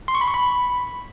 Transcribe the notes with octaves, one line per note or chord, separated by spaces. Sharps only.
C6
C#6
B5
C#6
B5